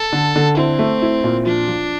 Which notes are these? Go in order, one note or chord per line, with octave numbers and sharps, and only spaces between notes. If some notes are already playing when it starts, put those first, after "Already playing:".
Already playing: A4
D3
D3
C4 E4
A3
E4
A#2
F3 D4
F3